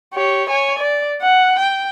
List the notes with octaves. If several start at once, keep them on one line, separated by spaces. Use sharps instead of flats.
G4 C#5
C#5 G#5
D5
F#5
G5